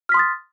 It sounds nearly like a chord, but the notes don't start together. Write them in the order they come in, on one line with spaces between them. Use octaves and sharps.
F6 B6 C6 D#6 A6